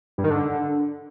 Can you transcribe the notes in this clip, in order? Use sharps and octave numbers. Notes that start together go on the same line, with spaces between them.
G2
D#3
D3